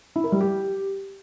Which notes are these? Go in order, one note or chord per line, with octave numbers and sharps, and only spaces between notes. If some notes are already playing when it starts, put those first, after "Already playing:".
E4
A#4
G3
G4